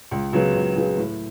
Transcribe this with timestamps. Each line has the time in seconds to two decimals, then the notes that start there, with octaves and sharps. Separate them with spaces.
0.11 C#2
0.33 C#3 F#3 B3
0.55 C#2
0.76 C#3 F#3 B3
0.98 A2